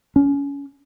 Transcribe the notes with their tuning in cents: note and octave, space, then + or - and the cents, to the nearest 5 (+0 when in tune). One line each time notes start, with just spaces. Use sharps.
C#4 +25